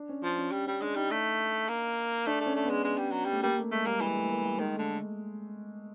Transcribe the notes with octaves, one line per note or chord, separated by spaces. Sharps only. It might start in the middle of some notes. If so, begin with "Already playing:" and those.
Already playing: D4
C#4
F3
C#4
G3
G3 C#4
G#3 D4
G3 D#4
A3
A#3
A3 D4
A3
C#4
A3
G#3 B3
G#3
G3
F#3
G3
A3
G3 A#3
A3
G#3 A3
G3 A#3
E3 G#3
A3
A#3
G3
D#3 G#3
D3 A3